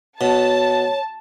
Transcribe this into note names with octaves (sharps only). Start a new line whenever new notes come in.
B2 C#5 A5